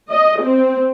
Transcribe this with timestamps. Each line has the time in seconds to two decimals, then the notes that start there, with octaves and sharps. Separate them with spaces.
0.12 D#5
0.41 C4